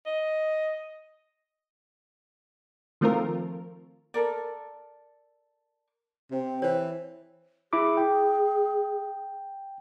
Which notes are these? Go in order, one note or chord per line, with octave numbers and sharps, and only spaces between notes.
D#5
D#3 F3 A3 C4 F4 A#4
A4 A#4 D5
C3 C4
E3 C5 C#5
E4 G#4 B5 D6
G5